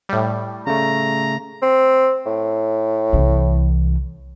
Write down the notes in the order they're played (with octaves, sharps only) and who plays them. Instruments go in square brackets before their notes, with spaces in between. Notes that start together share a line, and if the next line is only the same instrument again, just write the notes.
[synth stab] A2 G3
[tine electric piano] C#3 A3 [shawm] A#5
[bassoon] C4
A2
[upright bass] C2 E3